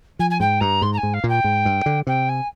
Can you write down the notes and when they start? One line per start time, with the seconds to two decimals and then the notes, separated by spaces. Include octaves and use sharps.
0.19 F3 G#5
0.30 G#5
0.40 G#2 G5
0.60 G2 A#5
0.82 G#2 C6
0.93 A#5
0.97 G#5
1.03 G#2
1.13 F5
1.24 A#2
1.29 G5
1.44 G#2
1.65 G2
1.86 D3
2.07 C3 G5
2.29 G#5